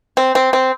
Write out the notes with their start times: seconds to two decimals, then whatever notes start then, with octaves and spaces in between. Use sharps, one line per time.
0.17 C4
0.35 C4
0.53 C4